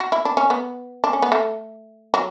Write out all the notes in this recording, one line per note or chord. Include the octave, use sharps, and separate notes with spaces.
F#4
E4
D4
C#4
B3
D4
C#4
B3
A3
F#3